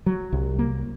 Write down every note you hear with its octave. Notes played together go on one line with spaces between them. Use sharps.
F#3
C2
A#3